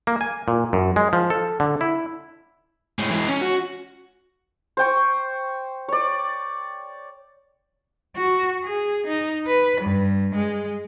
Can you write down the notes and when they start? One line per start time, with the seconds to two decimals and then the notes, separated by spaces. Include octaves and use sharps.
0.07 A#3
0.21 G#5
0.48 A#2
0.73 F#2
0.96 G#3
1.13 F3
1.30 A4
1.60 D3
1.81 E4
2.99 A2 G#3
3.11 E3 G#3
3.28 C#4
3.41 F#4
4.77 C5 G5 C#6
5.88 C#5 D5
8.16 F#4
8.64 G#4
9.07 D#4
9.47 B4
9.81 G2
10.35 G#3